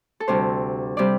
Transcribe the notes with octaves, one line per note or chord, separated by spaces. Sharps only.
A4
D2 C3 G3 C5
C3 G3 D5